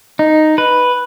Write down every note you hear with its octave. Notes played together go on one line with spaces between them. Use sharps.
D#4
B4